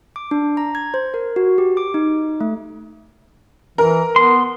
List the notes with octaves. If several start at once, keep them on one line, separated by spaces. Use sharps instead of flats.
D6
D4
A#5
G#6
C5
A#4
F#4
G4
D6
D#4
A3
E3 A#4
B3 C6